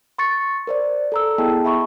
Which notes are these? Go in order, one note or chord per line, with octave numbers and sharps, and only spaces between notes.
C6 C#6 A6 C#7
A#4 C5 D5
A4 A#5 E6
B3 E4 G#4 D#5 G5 A5
E5 B5 C#6